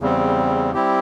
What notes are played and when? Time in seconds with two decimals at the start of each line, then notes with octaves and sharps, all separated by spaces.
0.01 E2 C#3 G3 C4
0.74 G3 C4 E4 G4